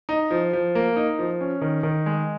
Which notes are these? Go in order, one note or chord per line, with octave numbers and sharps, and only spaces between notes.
D#4
F3
F3
A#3
D#4
F3
C#4
D#3
D#3
G#3